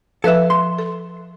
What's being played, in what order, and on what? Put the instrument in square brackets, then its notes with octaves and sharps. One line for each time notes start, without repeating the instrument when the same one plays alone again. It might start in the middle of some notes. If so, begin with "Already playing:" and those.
[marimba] F3 B4 F#6 [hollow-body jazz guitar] A4 E5
[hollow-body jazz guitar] C6
[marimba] A4